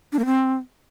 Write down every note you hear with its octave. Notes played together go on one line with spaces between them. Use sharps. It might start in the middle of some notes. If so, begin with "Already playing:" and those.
D4
A#3
C4